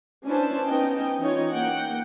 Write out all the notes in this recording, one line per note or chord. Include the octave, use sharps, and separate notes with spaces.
C#4 D4 E4 B4 C5 A5
B3 C#4 D#4 D#5 G5
E3 C#4 D#4 F4 C#5
A#3 F#5 G5